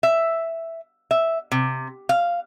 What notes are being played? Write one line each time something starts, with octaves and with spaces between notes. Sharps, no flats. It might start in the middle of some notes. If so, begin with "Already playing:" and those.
E5
E5
C3
F5